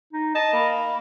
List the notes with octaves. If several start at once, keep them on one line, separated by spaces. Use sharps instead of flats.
D#4
D#5 A5
A#3 B5